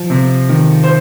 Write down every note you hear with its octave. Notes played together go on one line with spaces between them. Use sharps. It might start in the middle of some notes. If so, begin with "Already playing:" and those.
Already playing: F3
C3
D#3
C5